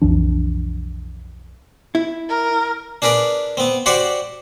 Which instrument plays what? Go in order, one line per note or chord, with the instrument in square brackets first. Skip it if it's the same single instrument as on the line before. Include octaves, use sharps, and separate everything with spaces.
[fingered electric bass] B1 F2 E3 D4
[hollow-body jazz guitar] E4
[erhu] A#4
[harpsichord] D4 G#4 A#4 B4 D5
B3 C4
F#4 G4 C5 D5 F#5 C#6